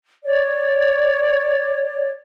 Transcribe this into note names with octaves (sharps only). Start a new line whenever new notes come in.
C#5 D5